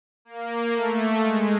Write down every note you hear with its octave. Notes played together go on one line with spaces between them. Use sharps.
A#3
A3
G#3